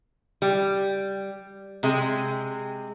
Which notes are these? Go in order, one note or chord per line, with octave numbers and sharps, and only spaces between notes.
G3
C3 G#3